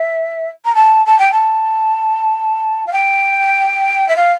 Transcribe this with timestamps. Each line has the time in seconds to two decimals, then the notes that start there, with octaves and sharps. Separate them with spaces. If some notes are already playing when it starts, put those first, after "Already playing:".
Already playing: E5
0.65 A#5
0.75 A5
1.06 A5
1.19 G5
1.32 A5
2.86 F5
2.93 G5
4.08 E5
4.16 F5